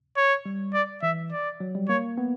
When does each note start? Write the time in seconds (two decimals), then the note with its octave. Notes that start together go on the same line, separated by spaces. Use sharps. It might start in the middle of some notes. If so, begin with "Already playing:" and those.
0.17 C#5
0.46 G3
0.74 D5
1.03 E3 E5
1.32 D5
1.60 F#3
1.75 G3
1.89 A#3 C#5
2.18 B3